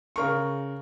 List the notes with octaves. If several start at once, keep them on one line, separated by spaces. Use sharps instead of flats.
C#3 A#4 C#6